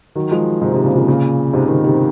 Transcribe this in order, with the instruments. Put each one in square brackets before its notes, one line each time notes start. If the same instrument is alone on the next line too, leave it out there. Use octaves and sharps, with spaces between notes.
[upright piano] D#3 F#3
F3 G#3
G#2 C3
G#2 C3
A#2 C#3
A#2 C#3
A#2 C#3
G#2 C3
C3 D#3
C3 D#3